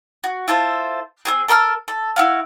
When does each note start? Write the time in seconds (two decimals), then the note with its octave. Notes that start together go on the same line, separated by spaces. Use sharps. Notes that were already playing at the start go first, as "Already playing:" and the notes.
0.24 F#4
0.48 E4 F4 A4 C5
1.25 C4 G4 G#4
1.48 A4 A#4 E6 F6
1.88 A4
2.16 E4 F#4 F5